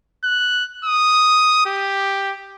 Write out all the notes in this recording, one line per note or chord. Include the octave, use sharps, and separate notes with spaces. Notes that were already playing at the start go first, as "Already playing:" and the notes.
F#6
D#6
G4